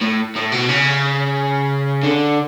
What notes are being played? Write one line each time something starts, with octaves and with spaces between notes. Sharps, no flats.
A2
A2
B2
C#3
D3